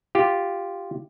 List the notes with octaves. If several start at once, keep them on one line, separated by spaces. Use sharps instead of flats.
F4 G4